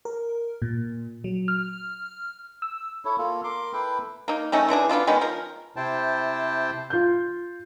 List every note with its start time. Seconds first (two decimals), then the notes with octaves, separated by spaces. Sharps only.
0.05 A#4
0.62 A#2
1.24 F#3
1.48 F6
2.62 E6
3.05 E4 A4 C#5
3.18 A#3 F4 A4
3.44 A#4 C6 D6
3.73 E4 A4 B4 G5
4.28 A#3 D#4
4.52 D#3 A3 C#4 D#4
4.68 D3 E3 D4 G#4
4.89 B3 D4 E4 F4
5.07 D#3 G#3 B3 C#4
5.21 F3 A#4
5.76 C3 E4 C5 G5 A5
6.90 F4 G6